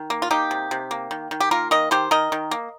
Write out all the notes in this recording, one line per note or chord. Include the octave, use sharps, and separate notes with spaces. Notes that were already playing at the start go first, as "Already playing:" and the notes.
Already playing: D#3
A#3
F4
A#3 D#4 G4
C3
C3
A#3
D#3
D#3
G4
A#3 F4 A#4
D#3 A#4 D#5
D#3 G4 C5
D#3 A#4 D#5
D#3
A#3